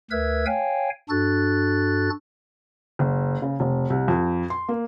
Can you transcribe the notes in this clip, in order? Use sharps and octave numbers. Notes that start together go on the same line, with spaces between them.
D2 A#4 B4 E5 E6 G#6
C#5 F5 G5 G#5
G2 D4 F#4 A4 F#6 A6
F#1
C#3
F1
C2
F2
C6
A#3